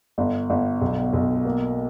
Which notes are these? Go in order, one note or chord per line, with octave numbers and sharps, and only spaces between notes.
G1
G1
B1
B1
A#3